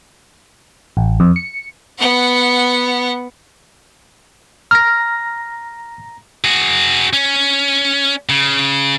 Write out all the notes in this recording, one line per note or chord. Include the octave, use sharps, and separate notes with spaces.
A1
F2
C#7
B3 F#5
A#5 F6 A#6
F#4 G#4
C#4
C#3